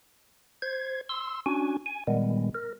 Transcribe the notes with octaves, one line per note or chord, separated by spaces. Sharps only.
C5 G#6
C6 E6
C#4 D4 F#4 G#5
G#5
A#2 D#3 G3 G#3 B3
A#4